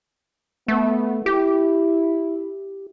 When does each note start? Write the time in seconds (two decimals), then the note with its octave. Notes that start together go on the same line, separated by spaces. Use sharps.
0.68 A3 B3
1.26 E4 G4